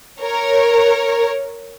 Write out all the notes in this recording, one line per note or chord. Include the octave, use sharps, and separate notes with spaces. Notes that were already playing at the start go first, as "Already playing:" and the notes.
A#4 C#5